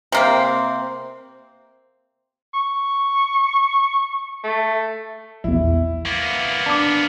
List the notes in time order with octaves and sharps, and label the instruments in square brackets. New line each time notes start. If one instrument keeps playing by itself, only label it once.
[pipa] C3 A#3 C4
[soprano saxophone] C#6
A3
[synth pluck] A#1 E2 [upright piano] E4
[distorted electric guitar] A#3 B3
[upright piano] D4 [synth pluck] A5 D6